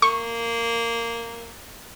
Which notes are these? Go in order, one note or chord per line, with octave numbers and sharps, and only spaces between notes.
A#3 C#6